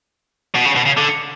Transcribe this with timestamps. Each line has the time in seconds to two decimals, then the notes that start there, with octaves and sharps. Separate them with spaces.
0.55 B2
0.65 C#3
0.75 B2
0.85 C#3
0.97 D3